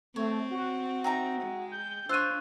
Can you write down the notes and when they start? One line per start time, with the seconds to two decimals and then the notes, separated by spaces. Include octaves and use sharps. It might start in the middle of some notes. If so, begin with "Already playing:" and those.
0.16 A3 C4 C#5
0.51 F#4
1.04 D#4 E5 G5 A#5
1.42 G#3
1.72 G6
2.09 D4 F4 C5 C#5 E6 F#6 D#7